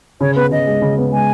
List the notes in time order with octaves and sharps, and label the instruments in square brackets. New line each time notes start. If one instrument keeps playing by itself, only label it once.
[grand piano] C#3 [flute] C#5
[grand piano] B3 [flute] B4
[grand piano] C#3 [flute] D#5
[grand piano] G#3
C#3
B3
[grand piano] G#3 [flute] G#5